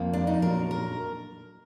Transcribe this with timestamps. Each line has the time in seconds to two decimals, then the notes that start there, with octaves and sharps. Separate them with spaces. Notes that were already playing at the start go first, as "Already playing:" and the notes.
Already playing: F2 F3 A#3
0.13 D4
0.27 D#4
0.42 A#2 F#3 D4 A#4
0.71 A#4